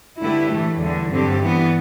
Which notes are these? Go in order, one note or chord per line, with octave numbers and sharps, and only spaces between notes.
D3 A3 E4 G4 B4
A2 E3 A3
E2 D3 G3
G2 D3 F#3 C4 G4
E3 G3 B3